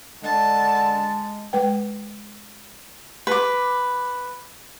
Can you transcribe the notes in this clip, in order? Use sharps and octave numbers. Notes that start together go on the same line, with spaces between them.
D3 G#3 A5
G#3 B4 G5
B4 D6